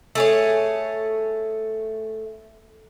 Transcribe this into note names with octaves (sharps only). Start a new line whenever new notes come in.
A3 G#4 C#5